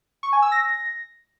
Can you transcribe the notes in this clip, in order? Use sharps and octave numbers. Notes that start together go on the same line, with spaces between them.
C#6
G#5
E6
A#6